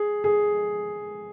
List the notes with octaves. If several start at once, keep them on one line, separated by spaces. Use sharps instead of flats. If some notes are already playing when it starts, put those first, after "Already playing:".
Already playing: G#4
G#4